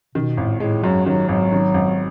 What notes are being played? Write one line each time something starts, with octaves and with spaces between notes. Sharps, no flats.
B2 D#3
G#1 A2
A2 G#3
F#2 F#3
D#3 F#3
G#1 F#3
D#3
G#1